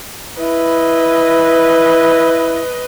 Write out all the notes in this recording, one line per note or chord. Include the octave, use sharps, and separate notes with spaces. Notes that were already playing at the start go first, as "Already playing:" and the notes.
E4 B4 D#5